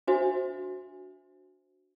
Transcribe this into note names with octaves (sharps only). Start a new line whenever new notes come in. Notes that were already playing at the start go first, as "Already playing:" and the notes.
D4 F#4 C5 E5